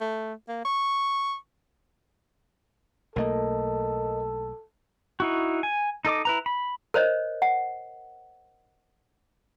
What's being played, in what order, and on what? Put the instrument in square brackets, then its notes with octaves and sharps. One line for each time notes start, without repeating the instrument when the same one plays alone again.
[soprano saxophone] A3
A#3
C#6
[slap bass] B1 A3 A#3 [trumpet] A4 [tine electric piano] A#4 D#5
[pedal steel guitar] D#4 E4 F#4
G#5
D#4 A4 D#5 D6
E4 B4 A#5
B5
[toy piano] A#4 C5 C#5 D#5
F#5